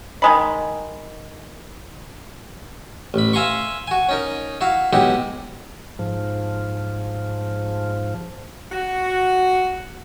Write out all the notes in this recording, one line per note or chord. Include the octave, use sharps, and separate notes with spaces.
D#3 G#3 B5
A1 B5
E5 F5 G#5 A#5 C6 C#6
F#4 G#5
C#4 D#4 A#4
E4 F#4 F5
B1 G#3 D#4 E4 G4 F#5
G#2 F3
F#4